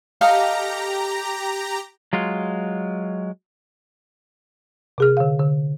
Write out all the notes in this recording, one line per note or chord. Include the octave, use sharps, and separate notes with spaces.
G4 A4 D#5 F5 A#5
F#3 G#3 F4
C3 G#4 F6
D3 F5
D3